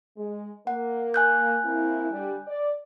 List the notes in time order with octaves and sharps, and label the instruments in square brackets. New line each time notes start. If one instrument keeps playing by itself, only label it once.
[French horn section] G#3
[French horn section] A#3 [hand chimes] F#5
[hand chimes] G#5 F#6 G6
[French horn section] A#3 C4 E4
D3 G3
D5